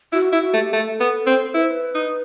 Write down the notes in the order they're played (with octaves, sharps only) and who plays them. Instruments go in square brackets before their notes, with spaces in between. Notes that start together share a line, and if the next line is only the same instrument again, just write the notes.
[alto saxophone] E4 [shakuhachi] F#4
[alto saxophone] E4 [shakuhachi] F#4
[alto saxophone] A3 [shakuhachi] G4
[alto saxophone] A3 [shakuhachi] A4
[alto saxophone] B3
C4
[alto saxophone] E4 [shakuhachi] B4
[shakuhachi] C5
B4
[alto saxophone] D#4